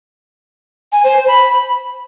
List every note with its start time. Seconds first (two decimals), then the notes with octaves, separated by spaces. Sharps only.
0.92 G#5
1.04 C5
1.16 C5
1.28 B5